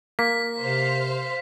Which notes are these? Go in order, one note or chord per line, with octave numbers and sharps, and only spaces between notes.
A#3 B6
C3 C5 F5